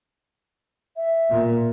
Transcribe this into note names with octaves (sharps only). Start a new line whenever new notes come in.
E5
A#2